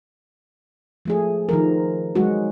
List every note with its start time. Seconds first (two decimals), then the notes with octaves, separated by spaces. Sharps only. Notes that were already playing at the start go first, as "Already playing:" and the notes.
1.05 F3 A3 G#4
1.49 D#3 F3 A#4
2.15 F#3 G#3 F#4